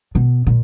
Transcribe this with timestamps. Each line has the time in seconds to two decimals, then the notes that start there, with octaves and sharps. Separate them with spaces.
0.15 B2
0.46 A#2